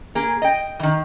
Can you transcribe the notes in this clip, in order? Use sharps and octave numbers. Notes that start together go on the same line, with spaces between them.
A#3 G#4
D#5 G5
D#3 E3